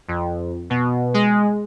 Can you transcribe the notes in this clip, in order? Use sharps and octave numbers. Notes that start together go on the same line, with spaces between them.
F2
B2
G#3